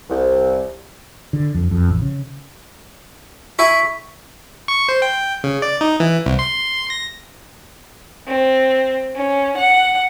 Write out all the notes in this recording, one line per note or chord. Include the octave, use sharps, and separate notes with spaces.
C2
D3
F2
F2
A1
C#3
E4 E5 G#5 C#6 B6
C#6
C5
G5
C#3
D5
D#4
E3
C2
C6
A#6
C4
C#4
F#5